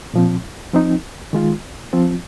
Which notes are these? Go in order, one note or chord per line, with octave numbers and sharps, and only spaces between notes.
A#2 F3 C4
F3 C4 D#4
D#3 G#3 F4
F3 C4 F4